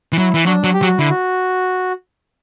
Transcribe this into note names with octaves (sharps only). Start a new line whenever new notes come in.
E3
F#3 E4
E3
F#3 D4
F#3
G4
F#3
F#4
D3 E4
F#4